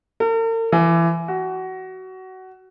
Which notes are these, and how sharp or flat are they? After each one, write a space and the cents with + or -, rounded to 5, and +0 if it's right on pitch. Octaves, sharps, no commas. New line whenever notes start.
A#4 -45
E3 +25
F#4 +20